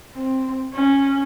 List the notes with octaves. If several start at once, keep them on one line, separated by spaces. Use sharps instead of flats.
C4
C#4